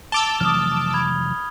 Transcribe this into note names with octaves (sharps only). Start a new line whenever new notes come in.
A5 D6 E6 F7 G7
F1 E3 F#3 D#6 F6
B5 G#6